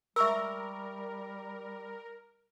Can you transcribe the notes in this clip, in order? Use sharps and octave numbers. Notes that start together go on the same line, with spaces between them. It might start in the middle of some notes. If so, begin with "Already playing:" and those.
G3 A#4 E5 C#6 E6